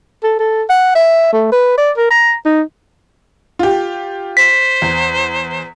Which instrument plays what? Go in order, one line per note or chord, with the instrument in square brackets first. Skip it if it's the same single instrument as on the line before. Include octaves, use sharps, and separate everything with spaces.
[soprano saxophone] A4
A4
F#5
E5
A3
B4
D5
A#4
A#5
D#4
[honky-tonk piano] F4 G4
[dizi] C5 [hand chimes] B6
[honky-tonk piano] E2